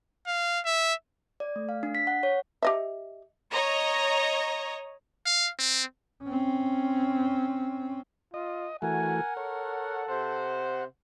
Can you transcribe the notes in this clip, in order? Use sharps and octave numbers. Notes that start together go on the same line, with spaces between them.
F5
E5
D5
A3
F5
D4
B6
F#5
C#5
G4 D#5 E5
C#5 D#5 A#5
F5
C4
C4 C#4
F4 D#5
E3 A3 F#4 A#4 F#5 G#5
A4 C#5
C3 C5 F#5